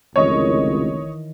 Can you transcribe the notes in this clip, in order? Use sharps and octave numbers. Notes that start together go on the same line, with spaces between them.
F1 C#2 D#3 E3 C#5 D#5